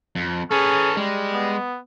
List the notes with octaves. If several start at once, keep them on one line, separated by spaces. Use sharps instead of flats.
F2
C#4 G#4 A4 B4
G3 G#3
B3